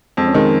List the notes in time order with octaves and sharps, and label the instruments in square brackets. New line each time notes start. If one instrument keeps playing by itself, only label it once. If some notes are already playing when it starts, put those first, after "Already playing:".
[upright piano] F2 [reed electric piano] F3 G#3
[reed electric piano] C#4
[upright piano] D#3 [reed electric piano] G#3 C4